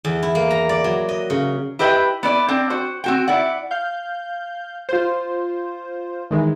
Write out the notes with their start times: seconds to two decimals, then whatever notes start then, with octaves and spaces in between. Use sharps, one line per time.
0.05 E2
0.23 E4
0.35 A#3
0.51 A#5
0.69 D5
0.84 F#3
1.09 D#5
1.30 C#3
1.79 E4 G4 B4 D#5 G5
2.23 B3 E4 D5
2.49 C4 D4 G5
2.70 F#4 C5
3.04 C4 F#4 G5
3.28 E4 D5 F#5
3.71 F5 G6
4.89 F4 C5
6.31 D#3 E3 G#3